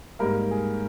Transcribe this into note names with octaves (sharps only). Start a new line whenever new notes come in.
G#2 G3 A#3 A#4
G#4